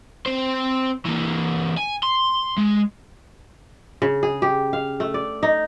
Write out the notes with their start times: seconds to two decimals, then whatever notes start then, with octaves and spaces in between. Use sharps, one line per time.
0.26 C4 C5
1.05 E3 A#3
1.77 G#5
2.03 C6
2.58 G#3
4.02 C#3
4.23 G#4
4.42 G4
4.73 F5
5.00 A3
5.14 D5
5.43 D#4